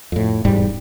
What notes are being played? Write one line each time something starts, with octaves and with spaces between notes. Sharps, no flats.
F2 A2
E1 G#2 G3